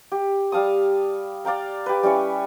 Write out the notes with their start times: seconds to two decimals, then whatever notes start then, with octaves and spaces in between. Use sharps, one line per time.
0.12 G4
0.52 G3 F5 A5 D#6
1.45 D5 F5 G5 A#5
1.86 G4 B4
2.03 G3 C#4 E4 C#5